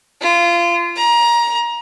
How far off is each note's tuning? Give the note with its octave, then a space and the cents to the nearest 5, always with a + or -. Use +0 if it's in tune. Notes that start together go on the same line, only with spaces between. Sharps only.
F4 -25
A#5 +20